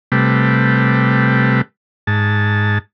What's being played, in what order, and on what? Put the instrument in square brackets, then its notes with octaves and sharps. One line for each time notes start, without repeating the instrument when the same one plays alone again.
[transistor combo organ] C3 G3 A3 B4
G#2 A5